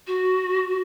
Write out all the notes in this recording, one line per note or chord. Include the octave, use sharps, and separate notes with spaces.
F#4